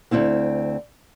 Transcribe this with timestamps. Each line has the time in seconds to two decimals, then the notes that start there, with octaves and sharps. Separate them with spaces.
0.11 D2 C#3 C4 E4 F5